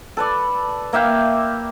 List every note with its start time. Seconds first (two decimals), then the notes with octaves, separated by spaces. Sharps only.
0.17 A4 B4 D5
0.93 A#3 E5 F5 G5